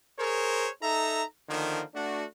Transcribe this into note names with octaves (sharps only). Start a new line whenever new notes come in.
G#4 A#4 C5 C#5
D#4 A4 E5 A#5
D3 D#3 F3 A#3
A3 D4 F#4